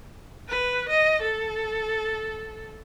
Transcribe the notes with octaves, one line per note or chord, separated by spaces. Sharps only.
B4
D#5
A4